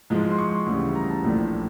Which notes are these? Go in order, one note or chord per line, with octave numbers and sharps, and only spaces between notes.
G#2 F3 G#3
C6
C#6
D2 C#3 E3 G3
A#5
A5
A#1 A2 F3 A3 D4